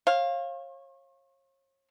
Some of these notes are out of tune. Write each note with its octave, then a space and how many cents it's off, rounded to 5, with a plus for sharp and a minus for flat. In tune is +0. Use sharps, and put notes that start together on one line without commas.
C#5 -40 F5 +0